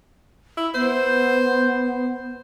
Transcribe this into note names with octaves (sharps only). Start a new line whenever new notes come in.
E4
B3 C5